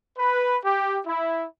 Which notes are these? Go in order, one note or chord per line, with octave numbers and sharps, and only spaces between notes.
B4
G4
E4